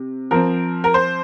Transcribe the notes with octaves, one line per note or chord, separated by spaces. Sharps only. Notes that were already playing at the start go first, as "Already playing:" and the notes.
Already playing: C3
F3 C4 A#4
A#4
C5